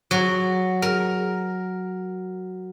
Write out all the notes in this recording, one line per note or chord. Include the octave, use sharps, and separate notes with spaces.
F#3
A#4